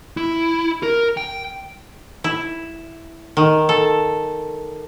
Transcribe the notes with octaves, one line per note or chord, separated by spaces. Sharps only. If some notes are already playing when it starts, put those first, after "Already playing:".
E4
A#4
G5
E4
D#3
A4